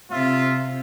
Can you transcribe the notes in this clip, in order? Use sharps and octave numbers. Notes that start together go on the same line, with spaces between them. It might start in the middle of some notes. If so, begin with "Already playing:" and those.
C3 F4 E5